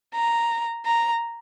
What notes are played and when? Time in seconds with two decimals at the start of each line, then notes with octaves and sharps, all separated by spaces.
0.15 A#5
0.86 A#5